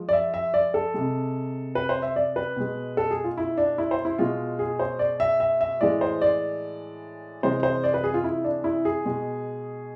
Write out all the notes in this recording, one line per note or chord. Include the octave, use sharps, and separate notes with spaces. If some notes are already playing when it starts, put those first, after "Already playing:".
Already playing: F3 G#3
D5
E5
E5
D5
A4
C3 G#3
B4
C5
E5
D5
B4
B2 G#3
A4
G#4
F4
E4
D4
E4
C5
E4
B2 G#3 F4
G#4
C5
D5
E5
E5
E5
A2 E3 G#3 D5
C5
D5
C3 E3 G#3 C5
C5
D5
B4
G#4
F4
E4
D4
E4
G#4
B2 G#3